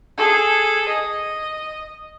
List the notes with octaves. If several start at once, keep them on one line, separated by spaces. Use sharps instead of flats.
G#4 A4
D#5